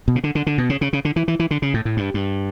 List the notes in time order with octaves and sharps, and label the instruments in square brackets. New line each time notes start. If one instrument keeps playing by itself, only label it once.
[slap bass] B2
C#3
D3
D3
D3
B2
C#3
C#3
C#3
D3
E3
E3
E3
D3
C#3
A2
A2
G2
G2